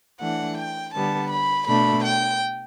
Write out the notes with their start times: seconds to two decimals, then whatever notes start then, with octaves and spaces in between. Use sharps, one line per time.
0.20 E3 A3 D4 F#5
0.57 G5
0.94 D3 G3 B3 A5
1.30 B5
1.67 B2 A3 D4 B5
2.03 G5